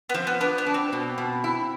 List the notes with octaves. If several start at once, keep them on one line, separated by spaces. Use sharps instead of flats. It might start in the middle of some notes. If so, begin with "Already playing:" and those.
B3
F3 C4
B3
B3 D4
B3
D4
C4
B2
B2
E4